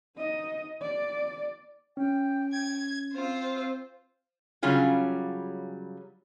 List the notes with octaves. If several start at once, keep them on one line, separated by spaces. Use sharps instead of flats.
D#4 D#5
D5
C#4 G5
G#6
C4 F4 C5
C#3 F#3 G3 C#4 F4 G#4